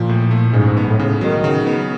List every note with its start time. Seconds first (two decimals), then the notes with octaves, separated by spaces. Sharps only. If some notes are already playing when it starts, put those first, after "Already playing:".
Already playing: A#2 F3
0.09 A2
0.31 A3
0.53 G#2 C#3
0.77 B3
0.88 A2
0.99 C#3
1.21 D#3 F#3
1.44 C#3
1.66 B3